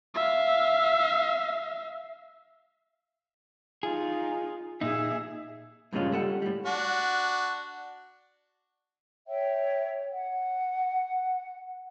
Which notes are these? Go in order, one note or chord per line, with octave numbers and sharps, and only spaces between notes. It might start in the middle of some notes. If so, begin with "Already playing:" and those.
E5 F5
D#4 F4 G#4
A#2 D#4 G#4 E5
G2 A#2 C#3 G#3 C#4 F4
G3 A4 F#5
A2 G3
D4 F#4
C#5 E5 G5
F#5